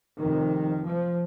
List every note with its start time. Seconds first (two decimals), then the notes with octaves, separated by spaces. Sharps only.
0.19 F1 F2 C3 D#3
0.87 F3